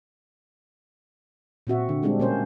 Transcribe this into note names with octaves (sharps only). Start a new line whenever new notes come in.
A#2 C4 F#4 E5
D3
G3 G#3 C4 D4
B2 A#3 C#4 C5